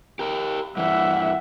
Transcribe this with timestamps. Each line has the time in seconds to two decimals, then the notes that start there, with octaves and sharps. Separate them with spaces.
0.19 G4 A#4
0.77 G2 E3 E5 F#5